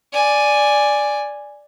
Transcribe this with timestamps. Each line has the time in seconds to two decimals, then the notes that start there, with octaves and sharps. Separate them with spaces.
0.12 D5 G#5